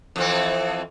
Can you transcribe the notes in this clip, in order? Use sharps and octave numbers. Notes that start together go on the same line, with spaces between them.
F2 E3 C4